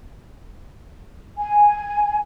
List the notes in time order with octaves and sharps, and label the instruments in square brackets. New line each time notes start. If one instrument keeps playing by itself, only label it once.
[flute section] G#5